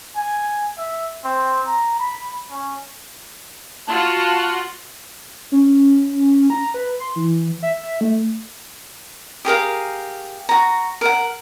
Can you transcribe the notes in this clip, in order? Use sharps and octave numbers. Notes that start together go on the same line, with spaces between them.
G#5
E5
C4
A#5
B5
C#4
F4 F#4 F#5 A5
C#4
A#5
B4
C6
E3
E5
A3
G4 G#4 A#4 F5
F#4 A#5
A#4 F#5